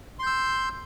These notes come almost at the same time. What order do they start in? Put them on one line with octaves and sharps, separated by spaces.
C6 G6 E6